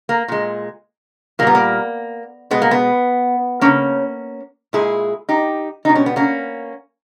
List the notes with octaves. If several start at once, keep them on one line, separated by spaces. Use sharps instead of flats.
A#3
A#2 G#3
A#2 G3 A#3 B3
A#3
B2 G#3 B3
A#3
B3
C#3 G#3 A#3 C#4
A#2 G#3 E4 G#4
D#4 G4
B2 G3 D#4
C#4
B3
A#3 C#4